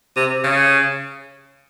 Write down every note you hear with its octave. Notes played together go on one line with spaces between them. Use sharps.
C3
C#3